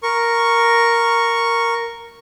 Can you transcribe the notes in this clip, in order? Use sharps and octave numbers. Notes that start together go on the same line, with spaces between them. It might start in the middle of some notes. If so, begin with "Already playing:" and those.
A#4 C#6